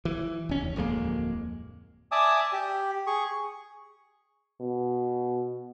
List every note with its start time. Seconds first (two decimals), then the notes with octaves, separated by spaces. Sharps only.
0.05 E3
0.49 F1 C#4
0.60 D#2
0.76 D1 F2 G#3 A#3
2.12 D5 E5 G#5 A5 D6 D#6
2.53 G4
3.07 G#4 C#6
4.60 B2